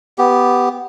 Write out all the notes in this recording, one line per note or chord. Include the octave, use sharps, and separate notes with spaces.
B3 G4